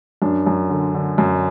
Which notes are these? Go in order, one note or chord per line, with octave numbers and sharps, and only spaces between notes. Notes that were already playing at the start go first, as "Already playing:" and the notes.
F#2 D4
F#2
D3
D3
F#2